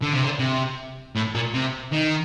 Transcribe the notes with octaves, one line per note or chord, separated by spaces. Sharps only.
D3
C3
D3
C3
A2
A#2
C3
D#3